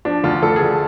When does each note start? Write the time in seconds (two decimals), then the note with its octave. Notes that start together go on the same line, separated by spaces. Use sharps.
0.05 F3 D4
0.24 D2 F4
0.42 D2 A4
0.56 G#4
0.62 D2